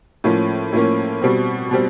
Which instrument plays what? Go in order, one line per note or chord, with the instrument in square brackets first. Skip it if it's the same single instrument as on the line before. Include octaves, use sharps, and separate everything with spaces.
[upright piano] A2 F3 A#3 C#4
A2 F3 A#3 C#4
B2 G3 C4
B2 G3 C4